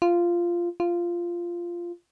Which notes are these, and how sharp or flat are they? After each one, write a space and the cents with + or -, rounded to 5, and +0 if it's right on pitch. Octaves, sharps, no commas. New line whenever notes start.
F4 -10
F4 -10